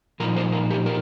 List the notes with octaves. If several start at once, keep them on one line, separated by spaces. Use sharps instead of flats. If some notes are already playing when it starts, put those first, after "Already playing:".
A#2 F3 A#3 D#4 A#4
C5
A#4
G4
A#4